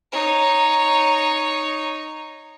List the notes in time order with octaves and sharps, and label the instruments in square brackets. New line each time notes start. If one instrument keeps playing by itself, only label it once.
[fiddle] D#4 C#5